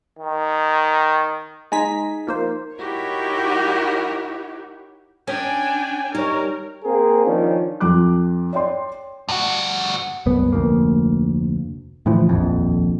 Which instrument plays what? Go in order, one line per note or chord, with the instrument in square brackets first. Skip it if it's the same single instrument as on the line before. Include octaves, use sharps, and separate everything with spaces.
[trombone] D#3
[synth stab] G#3 B6 [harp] D#4 G#5 A#5
[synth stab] F3 A#3 C5
[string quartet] D#4 E4 F#4 G4 A#4 C#5
[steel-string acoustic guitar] C#4 [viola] D4 [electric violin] G5 G#5
[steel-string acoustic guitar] G3 [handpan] D#4 C#5 [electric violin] A#4
[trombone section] A#3 C4 G#4 A#4
D#3 F3 C#4 D4
[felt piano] F2 F4 D6 F#6
C#5 D5 G5 C6
[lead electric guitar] G2 F#4
[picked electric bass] C2 F#2 B3
F1 D2 A#3
A2 D3 E3 F3
D#1 A#1 F2